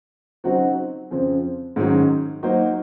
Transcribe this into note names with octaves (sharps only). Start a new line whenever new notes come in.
C#3 F#3 C4 D#4 F#4
F2 C#3 F3 C4
G#2 D#3 F#3 C#4
F#3 A#3 D#4 F#4 C5